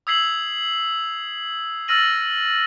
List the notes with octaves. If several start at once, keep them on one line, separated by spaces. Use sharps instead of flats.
D#6 E6 G#6 B6 C7 F#7
E6 F6 A6 A#6 D#7 F#7